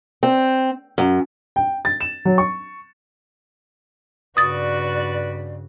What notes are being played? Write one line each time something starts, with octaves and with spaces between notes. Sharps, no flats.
C4
F#2
G5
A6
E7
F#3
C#6
G2 C#3 F#4 B4 D5 D#6 A6